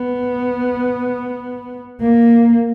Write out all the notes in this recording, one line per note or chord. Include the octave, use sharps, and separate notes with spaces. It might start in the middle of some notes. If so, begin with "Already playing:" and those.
Already playing: B3
A#3